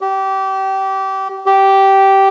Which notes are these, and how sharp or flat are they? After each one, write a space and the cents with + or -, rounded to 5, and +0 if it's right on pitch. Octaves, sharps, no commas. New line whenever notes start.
G4 -25
G4 -10